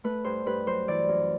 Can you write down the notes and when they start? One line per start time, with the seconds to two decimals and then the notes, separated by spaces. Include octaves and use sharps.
0.04 A3 B4
0.24 G2 C5
0.46 G2 B4
0.67 F#3 C5
0.88 E3 D5
1.09 F#2